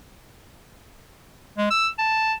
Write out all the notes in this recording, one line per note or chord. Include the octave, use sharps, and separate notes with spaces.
G#3
E6
A5